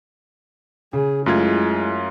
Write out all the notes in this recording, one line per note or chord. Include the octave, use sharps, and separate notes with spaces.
C#3 G#4
F#2 G#3 A3 E4 F4 G#6